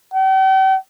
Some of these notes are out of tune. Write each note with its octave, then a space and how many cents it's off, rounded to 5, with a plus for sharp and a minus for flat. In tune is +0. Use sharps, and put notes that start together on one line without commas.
G5 -45